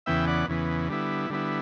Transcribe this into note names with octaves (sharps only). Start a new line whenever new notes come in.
E2 C#3 E3 B3 E5 G5
D5 F#5
E2 C#3 E3 B3
D3 G3 B3 E4
D3 G3 B3 E4